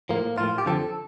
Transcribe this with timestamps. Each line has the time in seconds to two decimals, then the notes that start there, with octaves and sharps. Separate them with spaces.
0.09 A2 F3 A#3
0.38 A2 F3 F4
0.58 G4
0.66 F2 D3 F3 A4